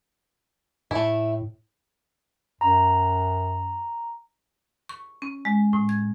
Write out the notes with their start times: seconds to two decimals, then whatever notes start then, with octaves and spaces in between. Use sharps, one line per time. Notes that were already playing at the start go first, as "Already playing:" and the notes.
0.91 A2 A3 E4
2.61 F#2 A#5
4.89 C#6
5.22 C#4
5.45 G#3
5.73 A2
5.89 G#6